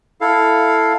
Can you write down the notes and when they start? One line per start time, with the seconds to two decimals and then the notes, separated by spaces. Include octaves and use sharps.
0.21 E4 A4 F5